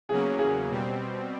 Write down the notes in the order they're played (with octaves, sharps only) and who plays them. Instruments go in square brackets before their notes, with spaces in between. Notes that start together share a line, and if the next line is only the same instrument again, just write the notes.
[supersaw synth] E2 C#3 F#3 A#3 C#4 [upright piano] G#4
[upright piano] G#4
[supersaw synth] B2 G3 C4